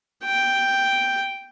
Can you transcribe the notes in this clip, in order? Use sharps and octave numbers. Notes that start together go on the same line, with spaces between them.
G5